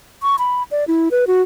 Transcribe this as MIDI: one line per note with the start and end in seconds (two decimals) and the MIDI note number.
0.23 0.36 85
0.39 0.63 83
0.71 0.84 74
0.88 1.09 64
1.11 1.25 71
1.27 1.42 66